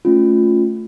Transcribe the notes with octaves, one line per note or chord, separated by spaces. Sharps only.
A3 C#4 F4